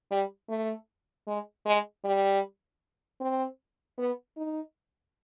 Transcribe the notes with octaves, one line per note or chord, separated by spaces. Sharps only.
G3
A3
G#3
G#3
G3
C4
B3
D#4